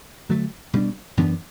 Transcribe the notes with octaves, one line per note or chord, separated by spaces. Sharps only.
D3 F#3 A3
B2 G3 D4
F#2 E3 B3 D4